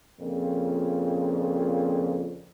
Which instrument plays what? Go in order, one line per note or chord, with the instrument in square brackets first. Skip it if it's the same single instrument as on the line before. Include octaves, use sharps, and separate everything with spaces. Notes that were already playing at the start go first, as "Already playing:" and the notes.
[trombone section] F2 A#2 C#3